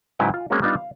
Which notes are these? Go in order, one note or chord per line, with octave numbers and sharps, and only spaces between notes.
G#2 C#3 F#3 E4 B4 G5
F4
G#3 A#3 C4 C#4 F#4
G3 B3 D4 D#4 F4
F5